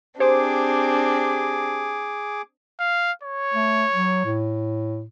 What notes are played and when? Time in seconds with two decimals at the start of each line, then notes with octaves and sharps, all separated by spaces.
0.20 C4 D4 G4 G#4 C5 D6
2.80 F5
3.23 C#5
3.54 A3
3.93 F#3
4.26 A2